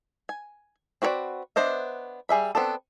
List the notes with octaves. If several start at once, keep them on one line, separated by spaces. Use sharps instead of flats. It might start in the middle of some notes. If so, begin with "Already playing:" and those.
G#5
C4 F#4 B4 C#5 D5
B3 D4 C5 D#5 E5
G3 G#4 E5 B5
B3 C4 D4 A4